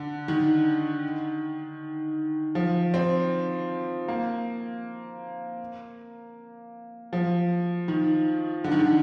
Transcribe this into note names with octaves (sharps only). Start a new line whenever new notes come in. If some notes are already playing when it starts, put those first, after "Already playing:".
Already playing: D3
D#3
F3
C4
A#3
F3
D#3
D3
D#3
D3